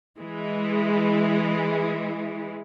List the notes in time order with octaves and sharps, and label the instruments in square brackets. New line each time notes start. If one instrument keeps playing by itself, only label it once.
[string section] E3 G#3